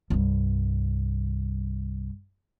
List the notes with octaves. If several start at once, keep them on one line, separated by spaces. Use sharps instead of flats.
C2 G2